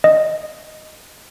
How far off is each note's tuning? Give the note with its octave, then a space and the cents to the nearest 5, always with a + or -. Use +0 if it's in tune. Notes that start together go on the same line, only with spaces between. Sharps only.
D#5 +0